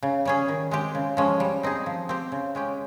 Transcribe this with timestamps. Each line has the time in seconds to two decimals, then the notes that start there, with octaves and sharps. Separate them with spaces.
0.03 C#3
0.25 G3 C#4 G#4
0.48 D#3
0.71 G#3 C4 G4
0.95 C#3
1.17 F3 G#3 C#4
1.40 G3
1.63 C4 D#4 G#4
1.86 F3
2.09 C4 G4
2.32 C#3
2.55 G#3 C#4 G4